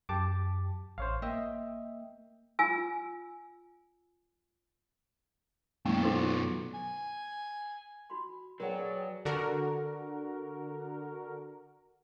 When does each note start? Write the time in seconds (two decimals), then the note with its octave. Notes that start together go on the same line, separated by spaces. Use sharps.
0.09 F#2 G4 A5 D6
0.98 A1 C5 C#5 F5
1.22 A#3 D#5 E5 G5
2.59 F4 G#5 E6
5.85 F#2 B2 G#3 A#3 G5
6.03 D#4 F4 C5
6.74 G#5
8.10 F#4 B5 C6
8.60 F#3 G#4 A#4 B4 C#5 D5 F#5 G5
9.25 D3 F#4 A#4